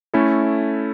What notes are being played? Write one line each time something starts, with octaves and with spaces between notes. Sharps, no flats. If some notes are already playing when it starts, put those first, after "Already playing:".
A3 C#4 E4 A4